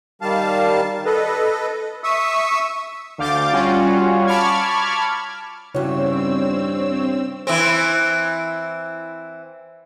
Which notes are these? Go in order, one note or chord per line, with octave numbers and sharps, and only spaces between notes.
D#3 G3 F5 A5
A4 B4 D#5
E5 C#6 D#6 E6
D2 F5 D6 G6 A6
G3 C#4 F4 F#4
A5 B5 C#6 D6 F6 G#6
E2 G2 C#3 C4 E4 F#4 C#5 E6
E3 C4